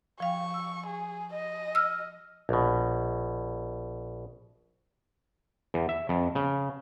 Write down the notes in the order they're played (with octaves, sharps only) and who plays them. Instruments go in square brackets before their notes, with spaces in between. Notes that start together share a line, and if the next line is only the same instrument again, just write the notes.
[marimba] F3 F5 G5 [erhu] C#6
[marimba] E6
[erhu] G#4
D#5
[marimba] E6 F6
[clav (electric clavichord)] A#1 B2
E2
E5
F2
C#3